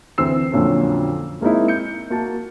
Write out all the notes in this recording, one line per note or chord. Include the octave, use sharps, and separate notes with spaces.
D2 E3 C4 E6 C7
F2 A#2 D3 F#3 C#4
G#3 A#3 C4 D#4 E4
G6 C#7
A#3 F#4 A5